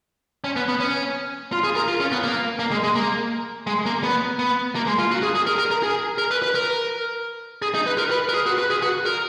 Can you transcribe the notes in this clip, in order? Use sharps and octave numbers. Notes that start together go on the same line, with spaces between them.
C#4
B3
B3
C#4
F4
G#4
A#4
F4
C#4
B3
A#3
A#3
G#3
G#3
A#3
G#3
A#3
B3
B3
A#3
G#3
F4
F#4
G#4
G#4
A#4
A#4
A#4
G#4
A#4
B4
B4
A#4
G#4
D#4
B4
A#4
B4
A#4
G#4
F#4
B4
G#4
F#4
A#4